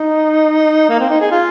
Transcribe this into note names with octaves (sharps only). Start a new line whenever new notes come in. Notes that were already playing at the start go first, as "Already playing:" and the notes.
Already playing: D#4
A#3
C4
D#4
G#4
F4